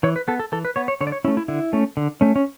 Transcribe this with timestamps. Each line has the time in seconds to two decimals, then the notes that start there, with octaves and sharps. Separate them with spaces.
0.03 E3 C#5
0.16 B4
0.28 B3 A4
0.39 A4
0.52 E3 A4
0.65 B4
0.76 B3 C#5
0.88 C#5
1.01 D3 C#5
1.07 D5
1.12 C#5
1.25 C#4 E4
1.28 A3
1.37 E4
1.48 D3 E4
1.73 A3 C#4
1.97 D3
2.21 A3 C#4
2.36 C#4